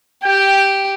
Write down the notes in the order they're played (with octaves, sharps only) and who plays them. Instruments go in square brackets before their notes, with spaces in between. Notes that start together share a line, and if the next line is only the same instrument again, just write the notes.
[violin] G4 [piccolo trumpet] G5